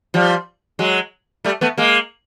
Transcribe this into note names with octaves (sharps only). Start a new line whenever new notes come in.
F3 G3
F#3 G#3
G3 A3
A3 B3
G#3 A#3